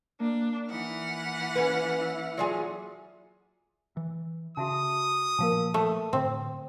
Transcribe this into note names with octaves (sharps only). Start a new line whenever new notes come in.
A#3 D4
E3 D#4 F#5 F6
C#4 B4
E5
F#3 F4 G#4 D5
E3
C#3 F#4 E5 A5 D#6
A#2 F3 A#3 A#4 F5 A5
A3
A2 D3 C4